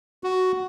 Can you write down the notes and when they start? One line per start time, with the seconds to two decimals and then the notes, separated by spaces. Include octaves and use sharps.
0.24 F#4